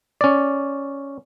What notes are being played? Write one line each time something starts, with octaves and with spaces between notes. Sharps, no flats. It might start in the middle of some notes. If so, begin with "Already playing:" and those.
C#4 D5